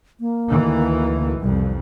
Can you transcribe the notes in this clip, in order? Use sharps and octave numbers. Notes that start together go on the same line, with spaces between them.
A#3
D2 D#3 E3
C2 F2 G3